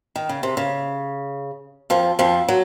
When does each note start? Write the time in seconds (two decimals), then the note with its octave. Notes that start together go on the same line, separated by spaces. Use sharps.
0.16 D#3
0.29 C#3
0.43 C3
0.57 C#3
1.90 F2 F3
2.19 F2 F3
2.48 F#3